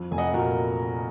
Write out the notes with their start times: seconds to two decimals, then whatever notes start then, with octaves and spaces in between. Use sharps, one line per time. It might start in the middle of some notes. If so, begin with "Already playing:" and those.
Already playing: F2
0.11 F1 G#5
0.18 D#5 F#5
0.33 A#2 F#4 A#4